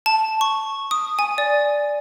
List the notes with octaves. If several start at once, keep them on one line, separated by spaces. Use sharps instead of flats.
A5
C#6
D#6
G#5
D5